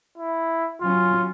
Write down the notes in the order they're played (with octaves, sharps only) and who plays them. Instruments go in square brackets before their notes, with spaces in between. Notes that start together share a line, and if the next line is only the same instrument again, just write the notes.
[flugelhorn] E4
[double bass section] F#3 C#4 [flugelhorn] F4